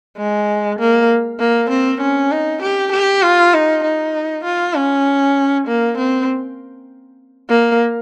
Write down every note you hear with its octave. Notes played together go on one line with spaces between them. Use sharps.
G#3
A#3
A#3
C4
C#4
D#4
G4
G4
F4
D#4
D#4
F4
C#4
A#3
C4
A#3